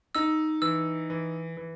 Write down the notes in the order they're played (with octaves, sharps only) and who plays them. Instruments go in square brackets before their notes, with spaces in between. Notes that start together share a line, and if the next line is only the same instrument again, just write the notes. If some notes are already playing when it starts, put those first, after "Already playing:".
[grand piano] D#4 [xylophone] E6
[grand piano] E3 [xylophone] E6
[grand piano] E3
E3